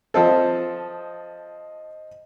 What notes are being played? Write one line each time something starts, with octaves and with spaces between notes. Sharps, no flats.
F3 C4 A4 C5 D#5